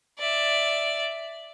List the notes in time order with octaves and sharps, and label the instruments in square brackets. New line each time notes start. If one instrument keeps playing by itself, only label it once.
[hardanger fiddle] D5 E5